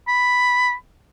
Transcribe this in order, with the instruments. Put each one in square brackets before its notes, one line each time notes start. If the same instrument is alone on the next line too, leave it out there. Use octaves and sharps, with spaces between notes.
[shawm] B5